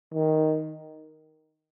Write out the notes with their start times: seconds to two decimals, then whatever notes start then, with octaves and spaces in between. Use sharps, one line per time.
0.14 D#3